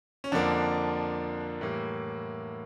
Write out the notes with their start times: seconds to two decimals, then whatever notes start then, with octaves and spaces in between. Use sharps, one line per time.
0.24 C#4
0.32 F2 D3 F3 A#3 D4
1.61 A2 E3 G3 A#3